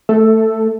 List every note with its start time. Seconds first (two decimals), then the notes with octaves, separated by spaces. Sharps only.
0.09 A3 A4